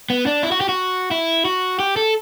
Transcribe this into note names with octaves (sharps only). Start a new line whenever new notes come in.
B3
D4
E4
F#4
G4
F#4
E4
F#4
G4
A4